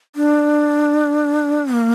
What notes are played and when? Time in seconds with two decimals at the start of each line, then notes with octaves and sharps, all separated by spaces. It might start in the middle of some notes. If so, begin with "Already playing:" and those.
0.16 D4
1.73 A#3